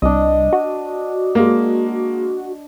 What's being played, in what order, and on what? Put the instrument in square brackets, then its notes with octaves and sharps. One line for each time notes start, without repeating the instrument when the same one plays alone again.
[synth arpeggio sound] C2 [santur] D4 D#5
[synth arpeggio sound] F#4
[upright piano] G#3 A#3